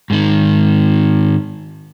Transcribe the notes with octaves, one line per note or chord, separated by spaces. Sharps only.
G#2 D#3